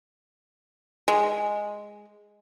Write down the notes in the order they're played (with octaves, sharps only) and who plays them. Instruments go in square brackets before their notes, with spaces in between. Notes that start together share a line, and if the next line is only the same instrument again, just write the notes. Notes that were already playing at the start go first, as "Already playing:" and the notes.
[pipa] G#3